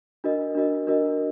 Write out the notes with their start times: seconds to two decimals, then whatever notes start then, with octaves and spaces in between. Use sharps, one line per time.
0.24 D4 F#4 A#4 D#5
0.55 D4 F#4 A#4 D#5
0.87 D4 F#4 A#4 D#5